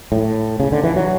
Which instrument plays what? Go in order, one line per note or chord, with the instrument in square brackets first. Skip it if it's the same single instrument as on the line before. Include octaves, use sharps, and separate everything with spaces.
[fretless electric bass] A2
C#3
D3
E3
F#3